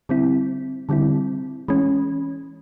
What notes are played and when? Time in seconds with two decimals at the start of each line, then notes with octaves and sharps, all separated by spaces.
0.09 D3 G3 C4 E4
0.89 D3 G3 C4 E4
1.68 E3 G#3 C#4